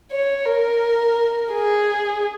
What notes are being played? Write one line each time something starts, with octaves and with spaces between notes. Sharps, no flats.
C#5
A#4
G#4